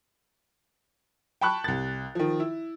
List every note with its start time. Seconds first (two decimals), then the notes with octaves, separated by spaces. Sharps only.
1.41 G5 A5 B5 C#6 F#6
1.64 C2 A6
2.15 D#3 F3
2.40 E4